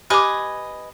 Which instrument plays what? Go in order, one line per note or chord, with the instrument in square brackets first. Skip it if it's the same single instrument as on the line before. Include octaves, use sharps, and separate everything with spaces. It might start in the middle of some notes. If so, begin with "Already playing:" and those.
[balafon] G4 D6 [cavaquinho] B4 D#5 G#5